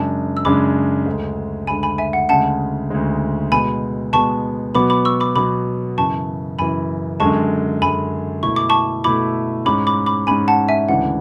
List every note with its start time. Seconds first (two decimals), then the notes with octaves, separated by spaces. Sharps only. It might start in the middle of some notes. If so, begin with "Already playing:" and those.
Already playing: F#2 C#3 G#3 D4 A5
0.37 E6
0.45 F#2 C#3 G#3 D4 B5 D6
1.06 D2 D3 G#3
1.67 D2 D3 G#3 G#5 B5
1.83 G#5 B5
1.98 E5 G#5
2.13 F#5
2.29 D2 C#3 G#3 F#5 A5
2.90 D2 C#3 G#3
3.51 B2 G#3 B3 G#5 B5
4.13 B2 G#3 B3 A5 C#6
4.75 B2 F#3 B3 B5 D6
4.90 B5 D6
5.05 C#6 E6
5.20 B5 D6
5.36 B2 F#3 B3 B5 D6
5.97 F#2 C#3 E3 A5 C#6
6.59 F#2 C#3 E3 G#5 B5
7.20 F#2 D3 G#3 A5 C#6
7.81 F#2 D3 G#3 G#5 B5
8.43 B2 A3 E4 C#6
8.56 D6
8.70 A5 C#6
9.04 B2 A3 E4 B5 D6
9.65 G#2 G#3 C#4 B5 D6
9.87 B5 D6
10.06 B5 D6
10.27 G#2 G#3 C#4 G#5 B5
10.48 F#5 A5
10.69 E5 G#5
10.88 D2 C#3 E3 G#3 D4 F#5